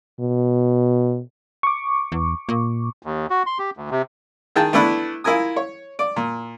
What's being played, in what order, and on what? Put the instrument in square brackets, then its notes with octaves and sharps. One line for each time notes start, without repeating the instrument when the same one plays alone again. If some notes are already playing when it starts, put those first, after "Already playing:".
[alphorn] B2
[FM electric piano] C#6 D6
[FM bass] E2
A#2
[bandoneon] D#2
F#4
C6
G4
D2
C3
[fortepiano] D#3 G#4 G5 A5
A3 B3 D4 E4 B4
E4 F4 A#4 G#5 D#6
C#5
D5
A#2